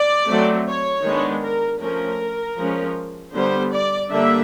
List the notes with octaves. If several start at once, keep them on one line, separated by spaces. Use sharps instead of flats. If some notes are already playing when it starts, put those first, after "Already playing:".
Already playing: D5
F#3 A3 C4
C#5
D#3 G#3 B3 D4
A#4
F3 A3 C#4 A#4
F3 G#3 C#4
D3 G3 B3 C5
D5
D3 G3 A#3 D4 E5